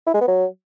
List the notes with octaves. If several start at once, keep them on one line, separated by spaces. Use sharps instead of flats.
E4
G#3
B3
F#3